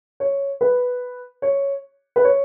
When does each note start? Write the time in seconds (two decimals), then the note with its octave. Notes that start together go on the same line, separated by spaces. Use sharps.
0.20 C#5
0.61 B4
1.42 C#5
2.16 B4
2.24 C#5